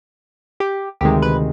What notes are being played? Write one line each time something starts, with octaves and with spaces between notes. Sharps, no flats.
G4
D2 C3 D#3 G#3 G4
B4